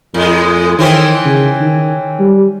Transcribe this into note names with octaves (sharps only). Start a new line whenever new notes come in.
F2 A2 G#3
D#3 E3 C4 C#4
C#3
D#3
G3